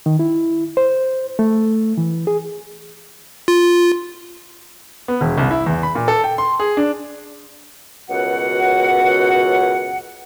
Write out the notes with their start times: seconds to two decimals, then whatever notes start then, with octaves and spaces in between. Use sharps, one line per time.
0.06 D#3
0.19 E4
0.77 C5
1.39 A3
1.98 E3
2.27 G#4
3.48 F4
5.08 B3
5.21 E1
5.38 C2
5.51 E4
5.66 E2
5.83 B5
5.95 A#2
6.08 A4
6.24 G5
6.38 C6
6.60 G#4
6.77 D4
8.10 C#2 F#2 B2 F#4 F#5